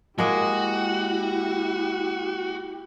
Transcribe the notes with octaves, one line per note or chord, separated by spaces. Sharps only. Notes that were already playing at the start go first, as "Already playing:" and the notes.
G#3 A#3 E4 F#4 G4 D#5